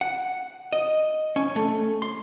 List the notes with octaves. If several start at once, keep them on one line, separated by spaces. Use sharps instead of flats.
F#5
D#5
C#4
A3
C6